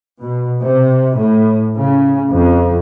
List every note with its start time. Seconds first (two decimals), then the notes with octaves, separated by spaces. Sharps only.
0.21 B2
0.62 C3
1.16 A2
1.75 C#3
2.31 F2